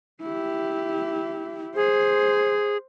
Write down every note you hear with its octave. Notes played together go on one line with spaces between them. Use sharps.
E4 G4
G#4 C5